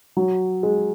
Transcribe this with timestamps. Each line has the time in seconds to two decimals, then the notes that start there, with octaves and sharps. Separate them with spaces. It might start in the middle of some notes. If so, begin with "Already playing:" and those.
0.17 F#3
0.63 G#3